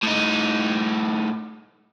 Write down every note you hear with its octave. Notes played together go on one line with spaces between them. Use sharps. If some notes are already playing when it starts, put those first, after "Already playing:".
A2 D#4